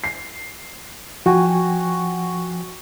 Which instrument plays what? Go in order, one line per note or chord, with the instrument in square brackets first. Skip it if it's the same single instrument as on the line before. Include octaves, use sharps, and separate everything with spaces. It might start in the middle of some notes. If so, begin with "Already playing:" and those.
[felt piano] C7
[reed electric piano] F3 G5 G#5 [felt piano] F#4